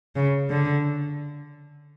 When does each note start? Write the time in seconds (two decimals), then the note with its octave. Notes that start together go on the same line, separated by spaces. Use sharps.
0.16 C#3
0.50 D3